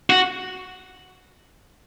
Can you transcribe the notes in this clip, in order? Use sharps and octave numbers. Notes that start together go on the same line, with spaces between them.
F#4